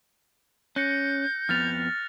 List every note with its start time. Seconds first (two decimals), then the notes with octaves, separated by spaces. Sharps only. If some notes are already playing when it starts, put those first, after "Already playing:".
0.76 C#4 F#6 G6 A#6 C#7
1.49 F2 B3 F6 A6 F7